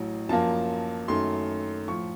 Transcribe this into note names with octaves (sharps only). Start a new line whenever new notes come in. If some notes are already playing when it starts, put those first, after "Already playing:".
Already playing: A1 A2 F#3
F#2 F3 A#3 A5
F#2 D#3 A3 C6
A2 F3 C#6